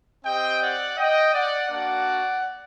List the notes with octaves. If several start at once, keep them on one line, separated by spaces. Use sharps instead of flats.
C4 G4 D#5 G5
D5 F#5
D#5 G5
D5 F#5
A#3 D4 F#4 D5 F#5